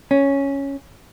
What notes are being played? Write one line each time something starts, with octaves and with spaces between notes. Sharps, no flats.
C#4